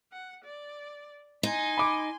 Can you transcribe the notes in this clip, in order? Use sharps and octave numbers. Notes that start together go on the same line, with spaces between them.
F#5
D5
D#4 G#5 C6
B5 D6